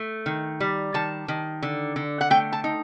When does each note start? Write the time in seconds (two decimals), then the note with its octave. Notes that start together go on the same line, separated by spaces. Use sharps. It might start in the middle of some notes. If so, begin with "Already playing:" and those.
Already playing: A3
0.26 D#3
0.60 G3
0.94 D#3 A5
1.28 D#3
1.63 D3
1.96 D3
2.21 F#5
2.30 A3 G5
2.53 A5
2.64 D#4